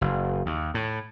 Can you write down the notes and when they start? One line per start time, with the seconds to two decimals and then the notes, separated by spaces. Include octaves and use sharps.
0.01 F#1
0.46 D#2
0.74 A2